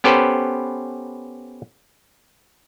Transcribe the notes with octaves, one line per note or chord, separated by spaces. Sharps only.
B3 C#4 G4 A4 B4 C5